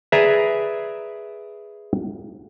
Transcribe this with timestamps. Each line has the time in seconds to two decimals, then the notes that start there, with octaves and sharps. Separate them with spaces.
0.12 G#4 B4 D5 E5 A#5